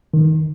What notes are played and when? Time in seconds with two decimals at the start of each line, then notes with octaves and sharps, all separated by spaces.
0.14 D#3